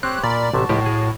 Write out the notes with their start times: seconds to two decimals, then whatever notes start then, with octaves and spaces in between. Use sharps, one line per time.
0.03 C4 G4 C5 C#5 F#6
0.24 A#2 A#4 D5 B5
0.54 A1 C3 F#4 E5 A5
0.69 C#2 A2 F3 G4
0.86 G#4